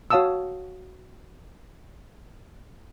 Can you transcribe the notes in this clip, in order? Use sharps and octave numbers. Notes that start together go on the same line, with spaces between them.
F#4 C#5 F5 A5 D#6 E6